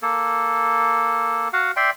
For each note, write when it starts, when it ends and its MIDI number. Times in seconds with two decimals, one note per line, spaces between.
0.02 1.48 58
0.02 1.48 69
1.53 1.71 66
1.53 1.71 77
1.53 1.71 78
1.76 1.90 74
1.76 1.90 76
1.76 1.90 79
1.76 1.90 84